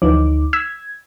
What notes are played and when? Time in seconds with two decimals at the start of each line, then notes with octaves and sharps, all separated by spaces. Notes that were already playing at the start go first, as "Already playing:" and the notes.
0.02 D2 E3 F3 D#4 D6
0.53 E6 G#6 B6 E7